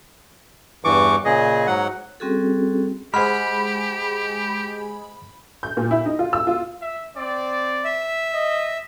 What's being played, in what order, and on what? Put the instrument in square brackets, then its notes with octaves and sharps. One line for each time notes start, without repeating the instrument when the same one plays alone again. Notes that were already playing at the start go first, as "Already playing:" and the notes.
[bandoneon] E2 G2 E3 C#6 D6
A#2 C#3 G#4 D#5
G#2 F#3 F#5
[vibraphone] G3 C4 C#4 F#4 G#4 A4
[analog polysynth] G#3 G#4 [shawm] G4 [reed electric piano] C5 F#5 F6 [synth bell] B5
[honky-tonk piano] G6
A#2
E4
D#4
F4
E6
F4
[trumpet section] E5
C4 D5
[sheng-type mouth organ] E5
[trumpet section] D#5